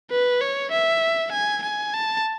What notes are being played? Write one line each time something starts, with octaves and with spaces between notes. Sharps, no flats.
B4
C#5
E5
G#5
G#5
A5